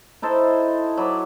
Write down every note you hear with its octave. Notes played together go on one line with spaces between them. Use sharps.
D#4 E4 A4 C5
F#3 B5 D6